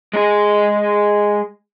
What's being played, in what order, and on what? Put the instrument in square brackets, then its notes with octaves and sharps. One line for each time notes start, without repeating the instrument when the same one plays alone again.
[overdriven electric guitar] G#3 G#4